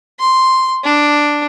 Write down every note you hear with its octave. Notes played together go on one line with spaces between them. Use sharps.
C6
D4